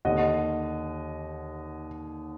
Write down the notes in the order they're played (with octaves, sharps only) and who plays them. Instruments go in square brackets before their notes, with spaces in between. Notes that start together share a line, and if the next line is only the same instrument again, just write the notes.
[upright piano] D#2 D3 D#5 F#5